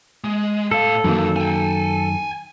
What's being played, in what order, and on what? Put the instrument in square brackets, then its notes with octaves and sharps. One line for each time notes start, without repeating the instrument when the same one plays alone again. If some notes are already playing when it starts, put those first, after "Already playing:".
[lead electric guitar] G#3
[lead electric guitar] A2 F5 [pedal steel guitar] A4
[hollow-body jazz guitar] F#2 D#3 A#3 [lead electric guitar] E3 C4
[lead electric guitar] G5 G#5